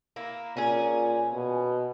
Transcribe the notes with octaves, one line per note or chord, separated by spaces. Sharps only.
A#3 E4
A#2 C#4 G#4
B2